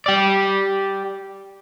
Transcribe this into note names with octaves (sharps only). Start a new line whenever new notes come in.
G4 D5